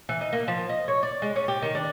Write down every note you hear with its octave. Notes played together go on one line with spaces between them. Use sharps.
E3
D#4
A#3
F3
D#5
C#5
D5
G#3
C#4
G4
D#3
D4